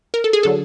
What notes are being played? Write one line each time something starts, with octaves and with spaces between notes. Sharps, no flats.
A#4
A4
G#4
D3 F#3 A4